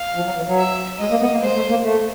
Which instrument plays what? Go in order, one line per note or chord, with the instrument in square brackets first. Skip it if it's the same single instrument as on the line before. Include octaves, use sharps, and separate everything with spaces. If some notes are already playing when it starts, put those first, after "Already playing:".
Already playing: [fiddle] F5
[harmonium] F3
F#3
E3
F#3
[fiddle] E5
[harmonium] G#3 [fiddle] D#5
[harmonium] A#3
B3
A#3
[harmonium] G#3 [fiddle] C5
[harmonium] A3
A#3
A3